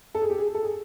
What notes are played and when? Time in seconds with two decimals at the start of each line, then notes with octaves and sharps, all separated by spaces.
0.15 A4
0.22 G#4
0.30 G4
0.38 G#4
0.55 A4
0.63 G#4